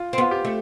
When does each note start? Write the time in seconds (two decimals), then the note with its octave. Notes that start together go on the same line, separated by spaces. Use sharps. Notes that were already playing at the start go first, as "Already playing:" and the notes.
Already playing: F4
0.13 C4
0.18 B3 F4
0.31 G4
0.45 A3